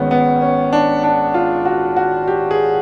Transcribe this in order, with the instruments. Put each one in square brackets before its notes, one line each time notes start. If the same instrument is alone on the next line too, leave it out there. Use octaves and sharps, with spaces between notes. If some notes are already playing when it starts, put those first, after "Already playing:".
Already playing: [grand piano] G#1 G#2 D#3 G#3 B3 C#4
B3
C#4
D4
D4
F4
F#4
F#4
G4
G#4